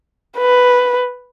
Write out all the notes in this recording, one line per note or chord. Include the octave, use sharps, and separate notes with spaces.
B4